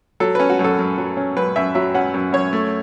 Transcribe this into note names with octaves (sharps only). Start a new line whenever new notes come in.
F#3 A4
C#4 B4
F#4
F#2
A4
F#2
F#3
C#4
F#2 B4
F#2 E5
F#3 E5
C#4 F#5
F#2
F#2 C#5
A3